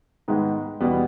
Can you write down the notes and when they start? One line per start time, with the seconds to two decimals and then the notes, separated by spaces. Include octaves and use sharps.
0.28 G#2 D#3 G#3 B3 D#4
0.80 E2 B2 G3 B3